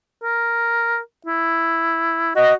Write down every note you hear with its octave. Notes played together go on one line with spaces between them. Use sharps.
A#4
E4
F#4 D#5